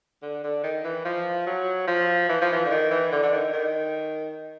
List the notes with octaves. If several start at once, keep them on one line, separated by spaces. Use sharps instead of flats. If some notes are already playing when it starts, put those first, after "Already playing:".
D3
D3
D#3
E3
F3
F#3
F3
E3
F3
E3
D3
D#3
E3
D3
D3
D#3
D#3